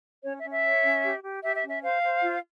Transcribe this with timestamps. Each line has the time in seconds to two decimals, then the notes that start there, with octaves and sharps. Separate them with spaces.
0.23 C#4 C#5
0.38 E5
0.43 C#4
0.50 E5
0.64 C#5
0.84 C#4
1.03 G4
1.23 G4
1.43 G4 E5
1.56 E5
1.63 C#4
1.69 E5
1.82 C5 F5
2.02 C5
2.22 F4